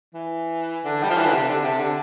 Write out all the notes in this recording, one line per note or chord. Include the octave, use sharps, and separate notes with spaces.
E3
D3
G3
F3
E3
D3
C3
D3
C3
D3